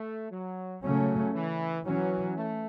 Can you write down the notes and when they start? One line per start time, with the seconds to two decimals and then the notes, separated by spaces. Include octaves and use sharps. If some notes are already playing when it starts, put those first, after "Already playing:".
Already playing: A3
0.31 F#3
0.83 C#3 F#3 A3 C#4
1.34 E3
1.86 E3 F#3 C#4
2.37 A3